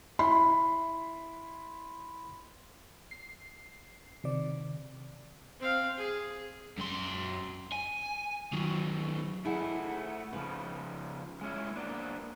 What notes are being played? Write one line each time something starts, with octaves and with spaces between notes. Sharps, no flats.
E4 B5 C6
C7
C3 D#3 D5
C4 F5
G#4
F#2 C6
G#5
D#3 F#3
A3 D#4 E4 G#4 F#5
C#3 F3 B4
G#3 C#4 E4
A#3 B3 D4